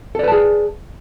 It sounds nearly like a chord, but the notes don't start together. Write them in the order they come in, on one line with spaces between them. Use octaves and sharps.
A4 D5 B4 A5 G#4